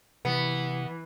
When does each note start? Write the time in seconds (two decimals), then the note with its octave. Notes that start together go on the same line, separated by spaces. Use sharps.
0.25 C3 E3 B3